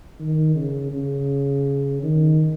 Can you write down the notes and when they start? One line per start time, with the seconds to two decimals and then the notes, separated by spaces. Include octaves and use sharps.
0.19 D#3
0.55 C#3
0.92 C#3
2.03 D#3